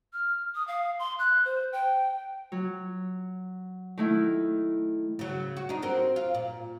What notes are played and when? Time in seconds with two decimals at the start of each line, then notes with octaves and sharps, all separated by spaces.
0.13 F6
0.55 D#6
0.68 F5
0.99 C6
1.19 F#6
1.45 C5
1.73 G5
2.52 F#3
3.98 D#3 A3 E4
5.19 C#3 F#3
5.57 F#4
5.69 D4 D#4
5.82 C4 F#4 A#4
6.16 F4
6.35 A#2